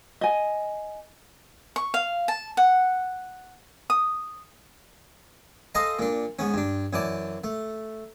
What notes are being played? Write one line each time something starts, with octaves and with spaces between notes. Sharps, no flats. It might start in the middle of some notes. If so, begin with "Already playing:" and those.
D#5 G#5
C#6
F5
A5
F#5
D#6
A4 C5 D#5 F5 G#5 A#5
A#2 D4
G#2 B3 C#4
G2 D4
F#2 E3 D5 A5
A3